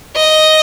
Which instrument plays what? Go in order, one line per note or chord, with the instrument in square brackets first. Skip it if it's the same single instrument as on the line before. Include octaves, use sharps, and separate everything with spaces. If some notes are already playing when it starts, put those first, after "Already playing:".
[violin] D#5